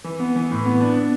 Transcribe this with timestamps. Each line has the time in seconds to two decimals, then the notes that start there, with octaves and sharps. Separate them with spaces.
0.04 E3
0.19 B3
0.36 E3
0.51 A2
0.65 B3
0.80 D4
0.95 B3